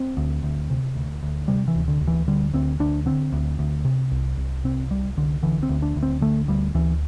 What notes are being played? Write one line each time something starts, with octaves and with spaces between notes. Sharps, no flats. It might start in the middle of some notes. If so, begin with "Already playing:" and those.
Already playing: C4
D2
D2
C3
D2
D2
C3 G3
E3
D2
D3
D2
E3
D3 G3
D2 C4
D2 D4
D3 C4
D2
D2
C3
C2
C2
C3 C4
C2 G3
C2 D3
D3 E3
C4
D2
D4
D2
C4
D3 A3
D2 G3
D2 E3